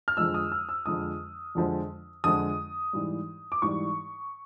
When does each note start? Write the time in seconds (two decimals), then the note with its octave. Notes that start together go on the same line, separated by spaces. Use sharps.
0.08 F6
0.17 F2 D3 F3 G#3 E6
0.34 D#6
0.52 E6
0.69 E6
0.86 F2 D3 F3 G#3 D#6
1.55 F2 D3 F3 G#3
2.24 F2 D3 F3 G#3 D#6
2.93 G#2 E3 G3
3.52 D6
3.62 G#2 E3 G3 C#6